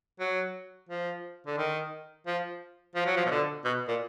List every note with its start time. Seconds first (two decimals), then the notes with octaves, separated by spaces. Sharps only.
0.19 F#3
0.89 F3
1.47 D3
1.58 D#3
2.27 F3
2.95 F3
3.06 F#3
3.16 F3
3.26 B2
3.31 D3
3.65 B2
3.88 A#2